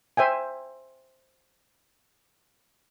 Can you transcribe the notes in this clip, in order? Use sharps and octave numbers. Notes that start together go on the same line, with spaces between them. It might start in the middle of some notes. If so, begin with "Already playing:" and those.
C5 E5 G5 G#5